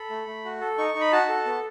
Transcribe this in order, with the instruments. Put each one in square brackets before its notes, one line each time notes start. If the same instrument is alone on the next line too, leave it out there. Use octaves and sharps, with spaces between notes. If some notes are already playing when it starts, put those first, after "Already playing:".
Already playing: [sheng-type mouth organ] A4 B5
A3
A3
F#4
A4
D#4 C#6
D#4
B5
F#4 A5
A4
B3